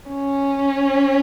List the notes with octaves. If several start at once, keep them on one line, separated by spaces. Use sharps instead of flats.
C#4